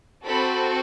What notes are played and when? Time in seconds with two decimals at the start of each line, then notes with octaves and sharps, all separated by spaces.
0.25 C4 F#4 A4 B5